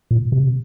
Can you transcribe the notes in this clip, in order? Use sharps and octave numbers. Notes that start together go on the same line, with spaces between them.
A#2
C3